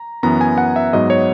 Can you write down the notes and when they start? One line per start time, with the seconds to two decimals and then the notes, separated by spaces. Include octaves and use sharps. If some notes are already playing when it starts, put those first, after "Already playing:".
Already playing: A#5
0.23 F#2 E3 B3 A#5
0.41 G#5
0.58 F#5
0.76 E5
0.93 G#2 F#3 B3 D#5
1.10 C#5